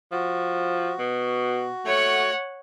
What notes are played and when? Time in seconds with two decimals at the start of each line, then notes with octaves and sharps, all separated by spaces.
0.12 F3 F#4
1.00 B2
1.86 A3 C#5 F#5